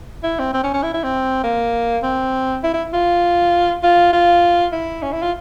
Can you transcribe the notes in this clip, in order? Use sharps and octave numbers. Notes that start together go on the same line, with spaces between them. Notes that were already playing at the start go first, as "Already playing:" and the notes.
E4
C4
C4
C#4
C#4
E4
E4
C4
A#3
C4
E4
E4
F4
F4
F4
E4
C#4
E4
F4